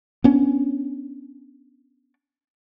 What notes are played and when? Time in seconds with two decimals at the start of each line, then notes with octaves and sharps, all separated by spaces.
0.24 B3 C#4 D4